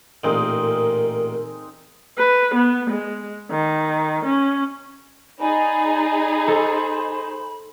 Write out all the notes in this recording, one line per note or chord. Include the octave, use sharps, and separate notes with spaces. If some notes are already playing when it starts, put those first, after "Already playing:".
A1 A#2 G#3 C4 D#4 A#4
B4
B3
G#3
D#3
C#4
D#4 G#4 D5 G#5 B5
A4 C5